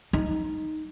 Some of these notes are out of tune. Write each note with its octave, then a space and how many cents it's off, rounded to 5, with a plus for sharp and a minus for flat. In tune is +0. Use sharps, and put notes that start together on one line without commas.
D#4 +0